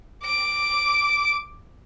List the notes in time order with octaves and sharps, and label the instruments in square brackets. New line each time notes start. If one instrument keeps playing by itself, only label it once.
[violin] D6 D7